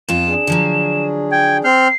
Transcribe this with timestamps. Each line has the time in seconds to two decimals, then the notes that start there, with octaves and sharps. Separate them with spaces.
0.09 F2 B3 F4 E7
0.28 D4 G#4
0.47 D3 F3 F#3
1.32 G5 G#6
1.65 C4 F6 G6 C7